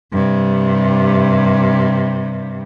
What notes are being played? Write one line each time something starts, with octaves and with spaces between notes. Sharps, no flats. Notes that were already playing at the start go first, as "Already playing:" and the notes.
G2 C3